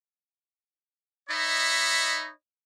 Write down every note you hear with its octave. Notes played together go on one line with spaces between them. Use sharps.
D#4 C#5 D#5 E5 B5